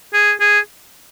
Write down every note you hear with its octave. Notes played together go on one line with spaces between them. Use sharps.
G#4
G#4